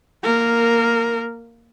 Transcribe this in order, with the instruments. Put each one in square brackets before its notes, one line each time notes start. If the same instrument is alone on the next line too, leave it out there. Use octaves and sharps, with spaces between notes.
[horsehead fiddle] A#3 A#4